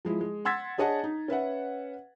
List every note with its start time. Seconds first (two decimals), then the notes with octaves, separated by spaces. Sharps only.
0.05 F3 G#3 E4
0.21 G#3
0.45 F#5 C6 E6 G#6 A6 B6
0.78 D4 G#4 C#5 D#5 F#5 A5
1.04 D#4
1.28 C#4 B4 E5 F#5